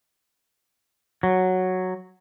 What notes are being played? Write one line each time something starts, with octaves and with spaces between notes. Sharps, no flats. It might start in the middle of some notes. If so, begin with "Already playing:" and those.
F#3